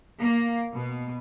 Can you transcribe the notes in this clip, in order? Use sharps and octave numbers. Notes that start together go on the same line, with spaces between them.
A#3
B2